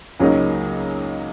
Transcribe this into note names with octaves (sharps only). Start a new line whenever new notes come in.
C#2 C#3 F#3 A#3 D#4